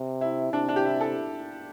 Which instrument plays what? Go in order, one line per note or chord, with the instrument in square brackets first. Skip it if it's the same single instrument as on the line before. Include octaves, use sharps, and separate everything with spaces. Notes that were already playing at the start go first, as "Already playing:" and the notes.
Already playing: [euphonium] C3
[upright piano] E4
[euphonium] C3 [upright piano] D4
[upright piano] D4
G4
E4
A4